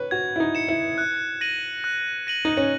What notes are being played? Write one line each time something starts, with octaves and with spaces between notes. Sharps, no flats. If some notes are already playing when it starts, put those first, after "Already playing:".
Already playing: B4 C#5
F#4 G#6
E4
D#4
C#7 E7
E4
F#6
A#6 D#7 F#7
F#6
A#6 D#7 F#7
D#4
C#4